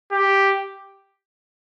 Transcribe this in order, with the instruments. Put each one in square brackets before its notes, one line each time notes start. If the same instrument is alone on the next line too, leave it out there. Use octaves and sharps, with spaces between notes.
[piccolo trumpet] G4